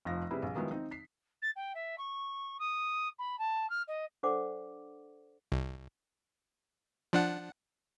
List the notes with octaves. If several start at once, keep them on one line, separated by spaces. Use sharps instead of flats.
F1 F3 A#6
C3 G3 E4 G#4 B4
A#1
D#3 F3 F#3 G#3 B3 E4
C4 D#4
B6 C7
A6
G5
E5
C#6
D#6
B5
A5
F6
D#5
D4 A4 C5 D5 F#5 D6
C2
F3 D4 F#5